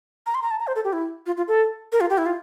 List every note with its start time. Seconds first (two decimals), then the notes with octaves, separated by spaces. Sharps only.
0.26 A#5
0.35 C6
0.42 A#5
0.51 A5
0.60 A#5
0.67 C5
0.76 A4
0.84 G4
0.93 E4
1.26 F4
1.37 F4
1.48 A4
1.92 A#4
2.01 F4
2.10 G4
2.18 E4
2.26 F4